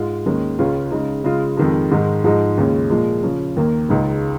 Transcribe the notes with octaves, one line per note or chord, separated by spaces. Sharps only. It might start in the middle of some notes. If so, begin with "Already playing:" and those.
Already playing: G#2 G#3 F4
D#2 D#3 G#3 C#4
C#2 C#3 G#3 C#4 F4
C#3 G#3 D#4
C#3 G#3 F4
F2 D#3 G#3
G#2 D#3 G#3 D#4
G#2 F3 G#3 D#4
D#2 C#3 G#3 C#4 F4
A#2 F3 G#3
C#3 F3 C#4
D#2 D#3 A#3
C#2 C#3 G#3 D#4